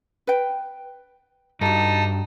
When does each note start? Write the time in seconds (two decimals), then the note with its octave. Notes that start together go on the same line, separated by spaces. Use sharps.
0.27 B4 G5
1.61 G2 D#4 F#4 A4 A5